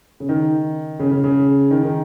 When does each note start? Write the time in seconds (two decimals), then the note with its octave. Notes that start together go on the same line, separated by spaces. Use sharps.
0.20 C#3
0.29 D#3
1.00 C#3
1.11 C#3
1.24 C#3
1.71 D#3
1.83 D#3